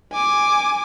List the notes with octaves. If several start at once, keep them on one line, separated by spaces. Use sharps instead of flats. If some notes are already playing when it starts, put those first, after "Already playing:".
G#5 D6